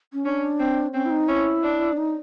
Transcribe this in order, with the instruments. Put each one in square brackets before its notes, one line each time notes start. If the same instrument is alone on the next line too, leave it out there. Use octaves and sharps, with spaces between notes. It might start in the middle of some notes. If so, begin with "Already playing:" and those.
[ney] C#4
[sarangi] C#4 [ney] D4
[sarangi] C4
[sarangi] C4 [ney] C#4
[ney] E4
D#4
[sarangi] C#4 [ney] E4
[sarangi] D4
[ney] D4
D#4